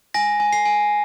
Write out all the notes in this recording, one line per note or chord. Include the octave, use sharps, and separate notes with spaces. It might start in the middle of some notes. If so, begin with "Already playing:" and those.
G#5 A#6
G#5
C7
G#5